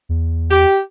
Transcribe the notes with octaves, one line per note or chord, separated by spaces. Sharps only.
E2
G4